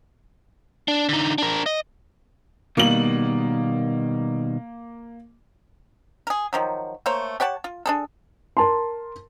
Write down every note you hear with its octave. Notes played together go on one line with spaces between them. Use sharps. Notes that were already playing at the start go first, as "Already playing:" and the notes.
D4
D3 D#4
D4 A#4
D#5
B2 D#3 G3 A#3 F#7
G#4 A#4
D#3 F3 F#3
A3 A#3 C5 C#5
G4 C#5 F#5 A5
F4
D4 G#4 A4
A#4 A5 C6